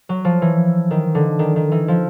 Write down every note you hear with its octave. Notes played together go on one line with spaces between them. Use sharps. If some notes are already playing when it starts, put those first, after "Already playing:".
F#3
F3
E3
D#3
D3
D#3
D#3
E3
F3